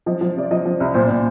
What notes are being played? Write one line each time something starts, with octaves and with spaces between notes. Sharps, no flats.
F3 D#5
F3
C3 D5
F3 D#5
F3
C2
A#2 C5
A#2 D5